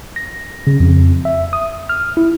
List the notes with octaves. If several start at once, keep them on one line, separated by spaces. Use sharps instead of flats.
A#6
C#3
F2
E5
D#6
F6
E4